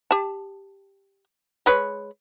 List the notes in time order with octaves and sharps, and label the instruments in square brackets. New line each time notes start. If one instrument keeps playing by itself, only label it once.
[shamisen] G4 A5
G#3 B4 C#5